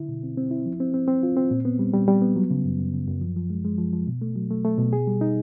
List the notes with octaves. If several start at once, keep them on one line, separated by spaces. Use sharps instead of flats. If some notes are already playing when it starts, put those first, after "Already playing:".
Already playing: D3 E4
B2
C4
C4
E4
F3
C4
C4
C4
F4
C4
A#2
B3
G3
G3
G3
B3
F#3
C#3
F#2
F#2
C#3
F#2
F3
F3
G#3
G#3
F3
F3
B2
A3
F#3
A3
A3
B2
G#4
G3
D#4